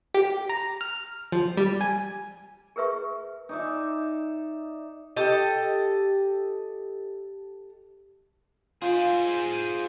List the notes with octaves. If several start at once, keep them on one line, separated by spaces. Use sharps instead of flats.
G4
A#5
F6
F3
G3
G#5
G#4 A#4 B4 E5 C#6
D#4 D5 E5
G4 A4 D#5
F4 G#4 C5